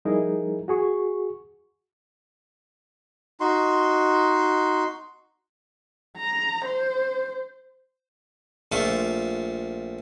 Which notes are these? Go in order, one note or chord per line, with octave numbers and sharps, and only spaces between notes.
F3 G3 D#4 E4 G#4 A#4
F#4 G#4 C#6
D#4 F#4 C6
A#5
C5
A#1 A3 F4 C#6